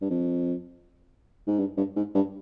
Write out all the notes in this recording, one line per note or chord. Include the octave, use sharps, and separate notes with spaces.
G2
F2
G#2
G2
G2
G#2
G2